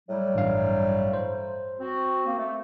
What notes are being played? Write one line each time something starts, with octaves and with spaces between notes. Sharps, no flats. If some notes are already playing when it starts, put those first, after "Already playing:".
A2 F#3 G3
A1 G2 F5
C5
C4 F#4
A#3 C4
A3